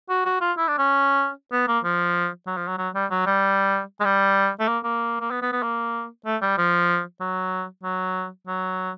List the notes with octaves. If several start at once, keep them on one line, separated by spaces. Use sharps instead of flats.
F#4
F#4
F4
E4
D4
C#4
B3
A#3
F3
F#3
F3
F#3
F#3
G3
F#3
G3
G#3
G3
A3
A#3
A#3
A#3
B3
B3
B3
A#3
A3
G3
F3
F#3
F#3
F#3